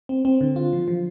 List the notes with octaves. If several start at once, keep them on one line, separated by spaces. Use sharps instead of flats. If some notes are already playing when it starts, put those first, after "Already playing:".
C4
C4
D3
F4
F3
F3